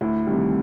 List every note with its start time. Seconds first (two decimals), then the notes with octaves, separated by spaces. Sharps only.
0.01 D2 E4
0.27 C3 D#3 G3